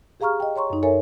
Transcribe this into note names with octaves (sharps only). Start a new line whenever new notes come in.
G4 G#4 F5 A#5 C#6 F6
D#5 G5
C#5 A#5 C6 C#6
F#2 D#4
A4 A#4 C#5 E5 G#5